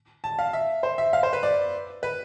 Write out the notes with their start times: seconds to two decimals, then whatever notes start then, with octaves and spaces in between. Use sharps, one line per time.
0.24 A5
0.39 F5
0.53 E5
0.83 C5
0.98 E5
1.13 F5
1.23 C5
1.33 B4
1.43 D5
2.03 B4